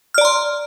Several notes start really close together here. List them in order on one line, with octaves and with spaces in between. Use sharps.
F6 D5 A#5 C6